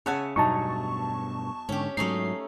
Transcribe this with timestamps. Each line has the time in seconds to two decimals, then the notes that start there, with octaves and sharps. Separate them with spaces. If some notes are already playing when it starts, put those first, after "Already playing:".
0.06 C#3 C#5 E5 F#5 G#5 A5
0.36 E2 G2 B2 F#3 D#4 A5 C#6
1.69 G#2 D3 C#4 G4
1.97 G#2 F#3 A3 C#4 D#4 C7